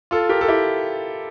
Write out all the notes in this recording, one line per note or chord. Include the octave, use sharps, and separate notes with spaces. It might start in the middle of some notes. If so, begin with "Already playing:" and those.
F4 A4
G4 A#4
A4
E4 G4